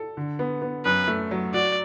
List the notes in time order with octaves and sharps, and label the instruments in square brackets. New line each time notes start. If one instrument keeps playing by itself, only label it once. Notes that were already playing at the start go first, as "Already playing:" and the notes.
Already playing: [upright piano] A4
D3
B3
B3
[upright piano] F#2 [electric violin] B4
[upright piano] A3
F#3
[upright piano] F#4 [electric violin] D5